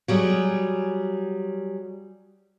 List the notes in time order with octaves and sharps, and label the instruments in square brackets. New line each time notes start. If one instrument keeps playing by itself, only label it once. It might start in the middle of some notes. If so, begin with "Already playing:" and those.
[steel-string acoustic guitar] F#3 G3 G#4